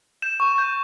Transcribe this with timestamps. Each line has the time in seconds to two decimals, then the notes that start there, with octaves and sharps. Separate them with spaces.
0.22 G6 E7
0.40 C#6
0.58 G6